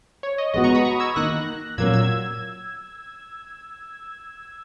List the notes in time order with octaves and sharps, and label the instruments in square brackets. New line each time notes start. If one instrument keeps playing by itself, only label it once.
[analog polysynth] C#5
D#5
[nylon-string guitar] G#3 B3 F#4 [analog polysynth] D#5
[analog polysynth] A#5 C#6
B5 D#6
A#5 C#6
E6 G#6
[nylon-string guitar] D#3 A#3 D#4 [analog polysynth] F#6 A#6
[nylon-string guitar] A#2 F#3 A#3 C#4 [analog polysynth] E6 G#6
[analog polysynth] E6 G#6